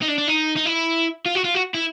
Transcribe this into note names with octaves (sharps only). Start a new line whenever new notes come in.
D#4
D4
D4
D#4
D#4
E4
F4
F#4
F4
F#4
E4